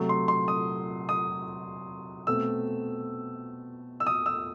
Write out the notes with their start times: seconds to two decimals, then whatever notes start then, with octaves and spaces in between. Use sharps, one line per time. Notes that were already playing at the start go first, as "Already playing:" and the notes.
Already playing: C3 F#3 A3
0.09 C6
0.28 C6
0.48 D#6
1.09 D#6
2.27 B2 A3 C4 E6
4.00 E6
4.07 D#6
4.26 E6